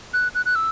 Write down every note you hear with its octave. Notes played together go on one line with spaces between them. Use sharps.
F#6
F#6
F#6
E6